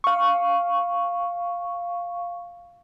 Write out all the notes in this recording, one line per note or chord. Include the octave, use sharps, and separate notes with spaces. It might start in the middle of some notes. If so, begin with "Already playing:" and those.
F5 C#6